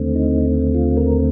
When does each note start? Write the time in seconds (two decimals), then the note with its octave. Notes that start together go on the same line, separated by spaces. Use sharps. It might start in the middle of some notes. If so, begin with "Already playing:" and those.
Already playing: D#2 D3 A3 C4
0.15 D#4
0.75 F4
0.97 A#4